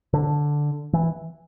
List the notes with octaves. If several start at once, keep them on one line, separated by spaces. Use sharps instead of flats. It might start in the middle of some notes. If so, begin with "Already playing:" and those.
D3
E3